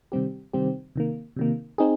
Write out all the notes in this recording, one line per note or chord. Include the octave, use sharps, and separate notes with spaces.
C3 D#3 G3 C4 G4
C3 D#3 G3 C4 G4
C3 D#3 A#3
C3 D#3 A#3
C4 D#4 G#4